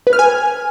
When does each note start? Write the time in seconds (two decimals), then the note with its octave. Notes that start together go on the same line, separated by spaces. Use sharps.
0.07 B4
0.13 F6
0.19 G#5